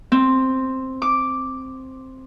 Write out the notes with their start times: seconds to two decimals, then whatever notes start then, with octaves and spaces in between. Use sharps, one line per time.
0.12 C4
1.02 D6